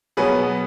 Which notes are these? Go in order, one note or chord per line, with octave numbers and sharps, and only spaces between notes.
B2 F#3 B3 G#4 B4